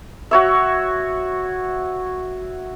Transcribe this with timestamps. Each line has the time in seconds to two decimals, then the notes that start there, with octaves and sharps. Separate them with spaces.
0.31 F#4 C#5 E5